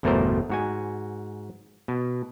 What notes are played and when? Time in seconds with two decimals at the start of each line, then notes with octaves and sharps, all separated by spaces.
0.03 G1 E2 B2 A3 A#4 C5
0.50 G#2 F#4 G#5
1.88 B2